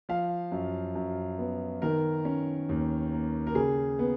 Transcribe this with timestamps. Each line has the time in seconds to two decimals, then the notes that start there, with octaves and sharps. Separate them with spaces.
0.09 F3 F5
0.52 F#2
0.95 F#2
1.39 B3
1.82 D#3 A#4
2.25 C#4
2.69 D#2
3.12 A#3
3.47 A#4
3.55 C#3 G#4
3.99 B3